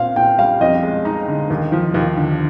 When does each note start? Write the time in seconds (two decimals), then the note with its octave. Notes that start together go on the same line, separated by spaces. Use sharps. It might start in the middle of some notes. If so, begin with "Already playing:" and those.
Already playing: A#2 C4 F5
0.16 A#2 G5
0.38 G3 F5
0.61 F2 D#5
0.83 G#3
1.05 D#4
1.28 D3
1.50 D#2
1.72 F3
1.94 D#2
2.17 D3